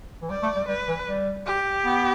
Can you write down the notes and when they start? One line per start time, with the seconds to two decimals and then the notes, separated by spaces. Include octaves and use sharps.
0.22 E3
0.30 G3 D5
0.43 A3
0.56 G3
0.68 G3 B4
0.88 E3
1.07 G3
1.46 G4
1.85 B3